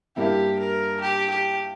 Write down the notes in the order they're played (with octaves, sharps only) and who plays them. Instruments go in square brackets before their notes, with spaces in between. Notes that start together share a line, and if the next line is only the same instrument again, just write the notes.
[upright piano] G2 G3 A#3 E4 [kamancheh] G4
[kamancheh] A#4
G4
G4